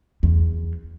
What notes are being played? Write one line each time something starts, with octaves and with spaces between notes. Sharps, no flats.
E2